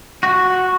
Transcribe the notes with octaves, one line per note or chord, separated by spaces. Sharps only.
F#4